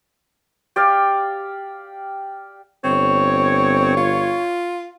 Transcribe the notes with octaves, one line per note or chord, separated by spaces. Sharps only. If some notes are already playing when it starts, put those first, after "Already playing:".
G4 D5 F5
G1 C4 C#5
F4